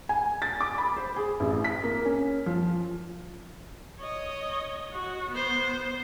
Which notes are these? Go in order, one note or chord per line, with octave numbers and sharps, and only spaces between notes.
G#5
A6
D6
B5
C5
G#4
A1
B6
A#3
C#4
F3
C#5 D#5
F#4
B3 C5